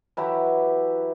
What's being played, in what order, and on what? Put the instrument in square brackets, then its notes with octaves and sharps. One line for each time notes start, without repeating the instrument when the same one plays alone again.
[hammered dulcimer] E3 F#3 E4 G4